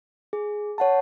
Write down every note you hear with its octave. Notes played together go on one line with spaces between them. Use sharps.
G#4
C#5 F#5 A5